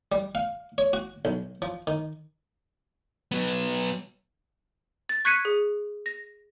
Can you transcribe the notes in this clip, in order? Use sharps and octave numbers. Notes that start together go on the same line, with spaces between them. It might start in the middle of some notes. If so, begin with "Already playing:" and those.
G3
F5
C#5
F#4
B1
F3
D#3
F#3 B3
A6
C#6 F#6 G#6 B6 C#7 D#7
G#4
A#6